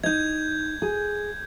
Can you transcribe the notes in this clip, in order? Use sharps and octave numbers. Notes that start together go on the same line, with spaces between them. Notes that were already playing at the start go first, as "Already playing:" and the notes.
D#4 D#5 G6 G#6
G#4